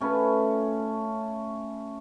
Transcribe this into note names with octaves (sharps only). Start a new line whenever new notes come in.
A3 C#4 F4 B4